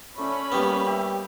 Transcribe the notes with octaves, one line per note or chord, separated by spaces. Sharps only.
A3 C#4 D5 B5
G3 A#3 B3 G4 C#5
G4 E5 D6